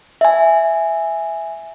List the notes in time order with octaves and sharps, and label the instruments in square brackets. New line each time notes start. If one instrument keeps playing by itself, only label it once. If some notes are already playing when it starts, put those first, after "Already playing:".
[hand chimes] E5 G#5